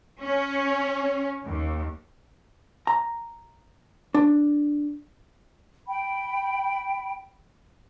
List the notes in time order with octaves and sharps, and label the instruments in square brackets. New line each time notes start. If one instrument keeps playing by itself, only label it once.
[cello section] C#4
D#2
[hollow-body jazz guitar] A#5
D4
[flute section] G5 B5